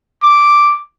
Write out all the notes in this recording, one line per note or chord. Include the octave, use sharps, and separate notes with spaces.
D6